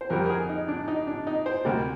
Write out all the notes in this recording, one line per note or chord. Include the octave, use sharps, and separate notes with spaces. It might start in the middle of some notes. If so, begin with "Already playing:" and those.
C5
F2 D3 G3 A#4
A#4
G#4
D#4
D4
D#4
D4
D#4
C5
D2 C3 G3 A#4